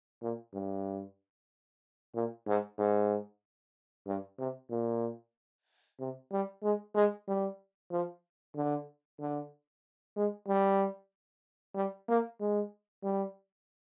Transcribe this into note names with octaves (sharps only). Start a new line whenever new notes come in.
A#2
G2
A#2
G#2
G#2
G2
C3
A#2
C3
G3
G#3
G#3
G3
F3
D3
D3
G#3
G3
G3
A#3
G#3
G3